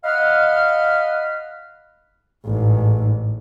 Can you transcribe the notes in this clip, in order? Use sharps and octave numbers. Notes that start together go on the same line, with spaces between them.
D#5 F5 F#5 B5 F6
A1 G#2